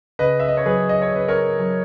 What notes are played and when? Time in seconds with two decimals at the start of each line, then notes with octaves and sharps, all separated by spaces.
0.19 C#3 B4 D#5
0.39 E5
0.48 D#5
0.57 C#5
0.66 F#3 G#4 B4
0.89 D#5
1.02 C#5
1.12 C#3 B4
1.28 A#4 C#5
1.59 F#3